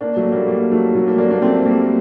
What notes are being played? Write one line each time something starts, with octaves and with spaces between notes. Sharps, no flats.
A#3 D4
F#3 A3
A3
G3 A#3
G3 A#3
F#3 A3
F#3 A3
G3 A#3
A#3 D4
A#3 D4
A3 C4
G3 A#3